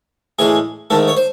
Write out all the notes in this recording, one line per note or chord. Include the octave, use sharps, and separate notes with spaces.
A2 E3 G#3 G#4
G#2 D#3 A3 A4
C#5
C5